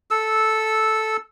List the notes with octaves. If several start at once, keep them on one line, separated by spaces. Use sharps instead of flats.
A4 E6